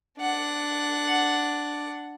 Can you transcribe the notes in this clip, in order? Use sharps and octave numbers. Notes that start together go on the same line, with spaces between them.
D4 F#5